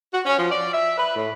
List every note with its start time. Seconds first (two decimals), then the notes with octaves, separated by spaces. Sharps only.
0.12 F#4
0.25 C#4
0.37 F3
0.50 D5
0.72 E5
0.97 B4
1.15 A2